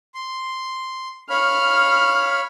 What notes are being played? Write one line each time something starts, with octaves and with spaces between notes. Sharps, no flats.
C6
C#5 F5 B5 F6